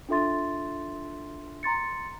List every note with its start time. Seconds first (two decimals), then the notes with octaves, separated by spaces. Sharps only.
0.09 D4 F4 A4 E5 C6 A6
1.63 A#5 C6 A6 C#7